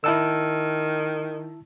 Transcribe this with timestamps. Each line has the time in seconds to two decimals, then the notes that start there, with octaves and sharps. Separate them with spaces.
0.04 D#3 E4 A5 E6